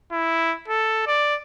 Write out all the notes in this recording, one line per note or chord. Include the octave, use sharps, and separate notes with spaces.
E4
A4
D5